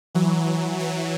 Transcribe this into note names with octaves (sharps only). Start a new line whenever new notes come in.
E3 F#3
E3 F#3